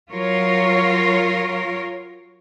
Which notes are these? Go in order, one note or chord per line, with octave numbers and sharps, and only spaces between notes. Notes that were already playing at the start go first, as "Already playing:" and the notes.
F#3 F4 A#4 C#5